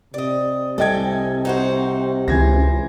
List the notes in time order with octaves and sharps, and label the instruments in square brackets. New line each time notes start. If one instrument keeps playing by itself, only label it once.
[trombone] C3 [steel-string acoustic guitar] D5 D#5
[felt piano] C2 D#5 G#6 [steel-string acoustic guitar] A4 G5 G#5
[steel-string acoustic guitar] D#4 F#4 C5
[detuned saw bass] C#2 [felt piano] E3 G#6 A#6 [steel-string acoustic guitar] C5